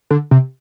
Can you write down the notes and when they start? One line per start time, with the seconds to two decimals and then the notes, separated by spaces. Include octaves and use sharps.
0.11 D3
0.31 C3